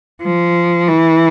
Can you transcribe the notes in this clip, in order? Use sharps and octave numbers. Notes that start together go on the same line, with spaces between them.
F3
E3